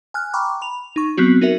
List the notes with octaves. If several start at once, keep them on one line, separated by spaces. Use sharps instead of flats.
G#5 F6 F#6
G5 A#5 B5 C#6 D6
B5 F7
D#4 C#6
F#3 B3 C4 F#4
D#4 F#4 A#4 E5